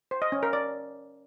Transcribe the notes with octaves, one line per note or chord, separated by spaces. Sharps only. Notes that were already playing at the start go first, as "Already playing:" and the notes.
C5
D#5
C#4
A#4
D5